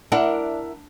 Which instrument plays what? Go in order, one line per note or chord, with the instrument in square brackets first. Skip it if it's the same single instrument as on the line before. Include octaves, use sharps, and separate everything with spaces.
[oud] D4 [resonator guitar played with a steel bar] E4 A#4 F#5